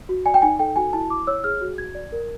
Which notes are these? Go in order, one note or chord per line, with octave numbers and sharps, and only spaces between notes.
F#4
D5 G#5
G5
D#4 G#5
A4 G5
F#4 G#5
E4 A5
E4 D6
C#5 E6
G#4 F6
F#4
F#4 G#6
D5
A#4